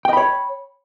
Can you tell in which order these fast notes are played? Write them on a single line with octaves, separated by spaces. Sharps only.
G5 D#5 B5 C#5